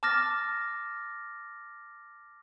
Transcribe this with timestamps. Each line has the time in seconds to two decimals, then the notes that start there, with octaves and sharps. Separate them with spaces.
0.03 A5 D6 F6 A6 A#6